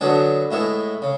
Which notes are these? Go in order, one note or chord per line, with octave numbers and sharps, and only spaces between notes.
D3 F#3 B3 D4 G#4
A2 G#3 B3 E4
C#3